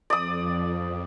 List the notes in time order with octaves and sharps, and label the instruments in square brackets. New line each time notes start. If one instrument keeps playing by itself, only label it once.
[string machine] F2 [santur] D5 D#6